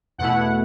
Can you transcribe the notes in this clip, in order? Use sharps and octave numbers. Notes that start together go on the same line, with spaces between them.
E2 B2 A3 E4 F#5